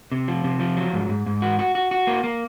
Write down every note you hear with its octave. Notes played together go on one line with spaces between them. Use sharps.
C3
F3
C3
F3
F#3
G#2
G#2
G#2
F#4
F#4
F#4
F#4
A#3
A#3